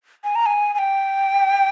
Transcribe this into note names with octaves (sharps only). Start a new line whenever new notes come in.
G#5
A#5
G#5
G#5
G5